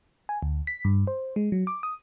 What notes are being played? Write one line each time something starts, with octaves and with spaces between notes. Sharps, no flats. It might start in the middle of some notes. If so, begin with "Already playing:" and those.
G#5
D2
B6
G2
C5
G#3
F#3
D6
D#6